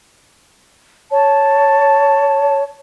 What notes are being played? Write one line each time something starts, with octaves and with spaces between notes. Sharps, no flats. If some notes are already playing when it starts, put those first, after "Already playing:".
C#5 A5